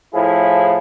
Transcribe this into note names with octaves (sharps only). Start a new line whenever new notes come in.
A2 F3 E4 G#4